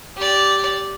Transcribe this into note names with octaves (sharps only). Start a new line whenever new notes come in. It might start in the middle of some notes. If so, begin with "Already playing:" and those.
G4 D5